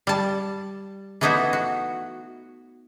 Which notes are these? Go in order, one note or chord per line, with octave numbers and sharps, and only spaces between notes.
G3 A5
E3 A3 B3 D#4 E4 F#4
F#4